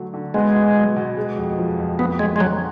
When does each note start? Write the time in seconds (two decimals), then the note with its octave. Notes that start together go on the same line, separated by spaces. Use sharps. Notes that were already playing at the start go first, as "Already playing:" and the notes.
Already playing: D3 F#3 A3 D4
0.14 D3
0.34 G#3 B3
0.55 B2
0.75 F#3
0.96 B2
1.17 G#3
1.37 F2
1.58 F3
1.78 F2
1.99 F3 B3
2.19 F2 G#3
2.36 G#3
2.40 D3 F#3